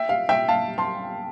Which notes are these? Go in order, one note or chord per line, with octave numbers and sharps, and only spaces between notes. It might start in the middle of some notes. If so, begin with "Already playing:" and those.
Already playing: E5 G5
F5
E5 G5
F5 A5
A5 C6